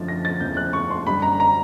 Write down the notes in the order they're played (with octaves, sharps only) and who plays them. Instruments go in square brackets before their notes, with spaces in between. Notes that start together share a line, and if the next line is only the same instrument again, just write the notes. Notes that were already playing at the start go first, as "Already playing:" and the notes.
Already playing: [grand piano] F#2 D3 F3 A3 [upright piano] A6
[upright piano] A#6
A6
[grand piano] E2 C#3 F3 A3 [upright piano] G6
[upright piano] F#6
C#6
C6
[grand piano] F#2 D3 G3 [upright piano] B5
[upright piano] A#5
A#5